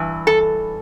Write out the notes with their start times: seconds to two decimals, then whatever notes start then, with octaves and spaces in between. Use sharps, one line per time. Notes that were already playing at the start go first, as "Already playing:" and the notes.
Already playing: G2 E3
0.27 A4